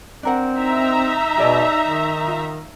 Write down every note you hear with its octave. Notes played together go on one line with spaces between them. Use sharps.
C4 D4 A#4 F#5
D#4 E5 A#5
B2 G#4 D5 D#5
D#3
F4